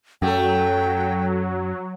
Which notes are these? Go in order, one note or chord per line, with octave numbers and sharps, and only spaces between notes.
F#2 F#3 A3 A4 G5